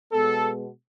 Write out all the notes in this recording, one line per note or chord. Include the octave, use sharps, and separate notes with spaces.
B2 G#3 B3 A4